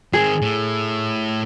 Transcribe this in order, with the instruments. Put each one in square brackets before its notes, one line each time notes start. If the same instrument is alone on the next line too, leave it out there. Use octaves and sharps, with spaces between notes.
[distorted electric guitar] D#3 C4 [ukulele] G#4
[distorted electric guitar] A2